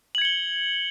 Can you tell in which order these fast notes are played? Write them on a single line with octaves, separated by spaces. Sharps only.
F#7 G#6 C#7 G7